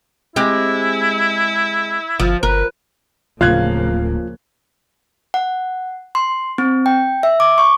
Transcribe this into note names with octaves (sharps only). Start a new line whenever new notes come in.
G#3 C4 E4 G4
G1 F3
G1 A#4 B4
D1 C#3 F3 A#3 F4 F5 F#6 G#6
F#5
C6
C4
G5
E5
D6
C#6